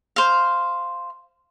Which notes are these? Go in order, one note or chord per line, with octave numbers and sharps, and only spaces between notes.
C5 F5